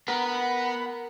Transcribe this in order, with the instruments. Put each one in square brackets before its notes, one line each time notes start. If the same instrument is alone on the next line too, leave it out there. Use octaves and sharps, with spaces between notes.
[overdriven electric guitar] B3 [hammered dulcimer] A#4 [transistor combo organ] F#5 B5